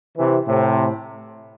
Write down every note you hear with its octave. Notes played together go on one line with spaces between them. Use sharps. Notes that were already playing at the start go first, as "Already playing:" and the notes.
C3 E3
A2 C3